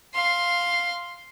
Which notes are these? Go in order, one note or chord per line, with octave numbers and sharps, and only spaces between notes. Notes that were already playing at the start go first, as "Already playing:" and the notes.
F5 C6